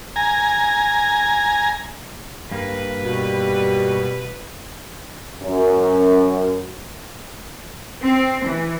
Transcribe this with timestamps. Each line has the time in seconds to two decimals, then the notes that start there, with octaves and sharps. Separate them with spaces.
0.16 G#5 A#5
2.51 G2 A#3 B4
3.02 B2 G3
5.43 F#2
8.02 C4
8.43 E3